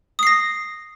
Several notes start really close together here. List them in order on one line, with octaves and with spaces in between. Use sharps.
D#6 C7 A#6